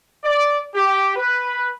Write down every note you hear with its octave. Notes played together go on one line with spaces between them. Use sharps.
D5
G4
B4